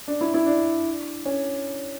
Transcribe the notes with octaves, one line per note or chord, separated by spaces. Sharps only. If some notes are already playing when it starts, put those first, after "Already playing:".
D4
E4
E4
D4
C#4